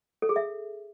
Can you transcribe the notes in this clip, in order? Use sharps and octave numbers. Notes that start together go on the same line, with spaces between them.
A4
G#4
E5